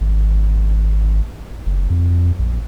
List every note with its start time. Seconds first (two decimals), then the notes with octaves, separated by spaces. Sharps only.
0.01 G#1
1.66 F#1
1.90 F2
2.39 A#1